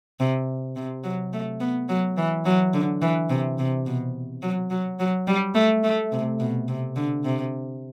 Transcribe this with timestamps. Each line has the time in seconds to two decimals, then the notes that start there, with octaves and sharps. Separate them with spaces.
0.20 C3
0.76 C3
1.04 F#3
1.33 A3
1.60 B3
1.89 F#3
2.17 E3
2.45 F#3
2.74 D3
3.02 E3
3.30 C3
3.58 C3
3.86 B2
4.42 F#3
4.70 F#3
5.00 F#3
5.27 G3
5.55 A3
5.84 A3
6.12 C3
6.40 B2
6.68 C3
6.96 D3
7.24 C3